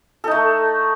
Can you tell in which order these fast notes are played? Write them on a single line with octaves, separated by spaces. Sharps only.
A4 D#4 A3